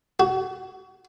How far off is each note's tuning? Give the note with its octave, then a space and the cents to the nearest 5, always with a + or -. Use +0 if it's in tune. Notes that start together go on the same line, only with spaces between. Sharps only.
F#4 +30